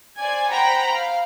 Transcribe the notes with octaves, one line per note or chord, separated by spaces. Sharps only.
C5 D5 G#5 G#6
C5 F#5 G5 A#5 B5
F5